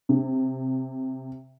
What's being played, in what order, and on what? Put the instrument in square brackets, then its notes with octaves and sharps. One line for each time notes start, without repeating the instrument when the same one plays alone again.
[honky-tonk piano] C3